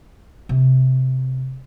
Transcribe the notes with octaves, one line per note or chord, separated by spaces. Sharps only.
C3